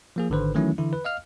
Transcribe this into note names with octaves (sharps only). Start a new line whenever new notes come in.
F3 A#3 G#4
G#1 D3 D#3 B4 C5
D#3 E3 F#3 A3 C#4 E4
D3 E3 E4
B4
D#5 F5 F6